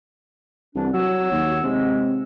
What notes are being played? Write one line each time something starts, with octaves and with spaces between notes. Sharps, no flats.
C2 D3 E3 D4
F#3 F#4 C#5 E6
D#2
C3 G#3